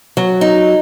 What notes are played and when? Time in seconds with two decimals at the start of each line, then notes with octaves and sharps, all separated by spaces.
0.17 F#3
0.41 D#4